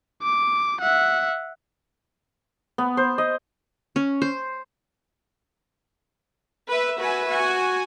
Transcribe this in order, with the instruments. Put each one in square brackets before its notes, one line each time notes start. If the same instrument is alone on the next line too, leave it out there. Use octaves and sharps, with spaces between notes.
[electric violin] D6
E5 F#5
[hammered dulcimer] B3
C5
D#5
[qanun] C#4
C5
[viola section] B4 E5
F#4 B4 E5 G#5
F#4 G#5